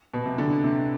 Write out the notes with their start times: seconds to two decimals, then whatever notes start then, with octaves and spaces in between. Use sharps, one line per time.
0.14 B2
0.26 C3
0.38 D3
0.64 C3